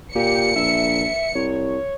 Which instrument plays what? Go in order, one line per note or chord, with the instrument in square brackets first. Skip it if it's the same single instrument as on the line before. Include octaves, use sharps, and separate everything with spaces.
[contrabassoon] A#2 [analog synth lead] G4 [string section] C#7
[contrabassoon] A#1 [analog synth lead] E5
[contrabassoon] C2 [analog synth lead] C#5